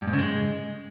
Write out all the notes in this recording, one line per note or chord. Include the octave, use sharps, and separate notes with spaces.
G2
G#2
C#3
G#3